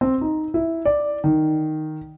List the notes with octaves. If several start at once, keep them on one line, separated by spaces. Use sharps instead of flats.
C4
D#4
E4
D5
D#3